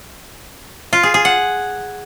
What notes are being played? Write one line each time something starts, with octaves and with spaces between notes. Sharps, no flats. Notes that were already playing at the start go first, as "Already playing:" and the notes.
F4
G#4
G#4
F#5